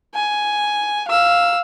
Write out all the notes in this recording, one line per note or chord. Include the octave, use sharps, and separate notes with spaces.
G#5
F5 E6